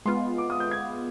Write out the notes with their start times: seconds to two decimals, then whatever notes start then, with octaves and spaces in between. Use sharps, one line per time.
0.05 G#3 B3 F4 C6
0.38 D6
0.50 D#6
0.60 G6
0.71 G#6